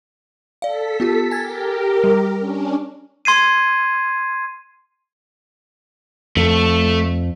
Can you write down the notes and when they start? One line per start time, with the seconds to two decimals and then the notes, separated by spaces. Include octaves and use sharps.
0.62 A4 D5 F5 B6
1.00 B3 F4 G4
1.31 G4 A#4 G#5 G#6 A6
2.04 G3
2.40 C#4 D4
3.25 C6 G#6 C7 D#7
6.37 F2 A3